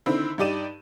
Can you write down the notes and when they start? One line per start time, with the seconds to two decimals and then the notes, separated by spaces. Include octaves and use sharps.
0.06 D3 D#3 C4 E4
0.38 G2 D#4 G4 D5 D#7 E7